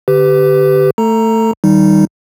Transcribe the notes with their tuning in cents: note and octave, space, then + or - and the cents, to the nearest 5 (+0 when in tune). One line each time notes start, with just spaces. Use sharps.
D3 +0 G4 +0 B4 +30
A3 +15 A4 +20 A#5 +0
D#3 +20 G3 +0 D#4 +0